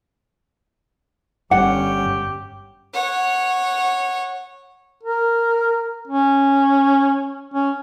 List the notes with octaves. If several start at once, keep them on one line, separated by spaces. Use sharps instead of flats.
G1 G2 G3 C#4 G4 F#5
C#5 F#5
A#4
C#4
C#4